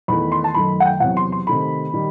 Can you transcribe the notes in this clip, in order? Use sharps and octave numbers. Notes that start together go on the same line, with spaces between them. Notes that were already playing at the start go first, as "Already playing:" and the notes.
E2 D#3 A3 B5
C6
A5
F#2 D#3 A3 B5
F#5
G5
E2 C3 F#3 F#5
C6
C6
C3 D#3 A3 B5
D#3 G3